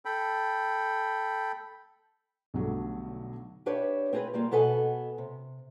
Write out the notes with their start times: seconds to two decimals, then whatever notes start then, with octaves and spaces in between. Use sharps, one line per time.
0.05 A4 G5 B5
2.54 B1 D3 F#3 G3 A3
3.66 D4 G4 B4 C#5 E5
4.13 C4 F4 G#4 A#4 B4
4.34 G3 A#3 F4
4.51 B2 B3 A4 B4 D#5 G#5
5.18 C3